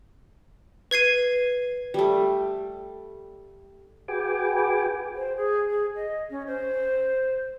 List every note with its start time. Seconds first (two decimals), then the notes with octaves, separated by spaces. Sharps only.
0.91 B4 G#6 C7 D#7
1.94 G3 A3
4.08 F#4 G#4 B4 G5 G#5 D6
5.15 C5
5.37 G#4
5.70 G#4
5.95 D#5
6.30 C#4
6.47 C5